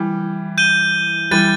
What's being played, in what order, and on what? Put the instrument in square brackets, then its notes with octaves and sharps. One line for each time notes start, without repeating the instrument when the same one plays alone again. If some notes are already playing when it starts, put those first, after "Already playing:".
Already playing: [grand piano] E3 G3
[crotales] G6 D#7 G7
[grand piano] E3 G3 [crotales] F#6 A6 D#7